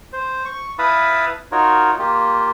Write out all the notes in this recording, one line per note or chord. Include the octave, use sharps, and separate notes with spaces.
C5
C#6
E4 B4 F5 A5 B5 D#6
D#4 F4 F#4 A#4 C#5
A#3 F4 G4